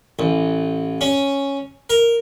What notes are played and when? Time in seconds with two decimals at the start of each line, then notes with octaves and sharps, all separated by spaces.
0.19 A1
1.01 C#4
1.90 A#4